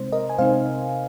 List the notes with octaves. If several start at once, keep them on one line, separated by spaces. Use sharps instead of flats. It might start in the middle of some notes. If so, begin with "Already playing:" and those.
Already playing: C3 G#3 C4 D#4 C5
A#4 D#5
G#5
C3 G#3 C4 D#4 C5 F5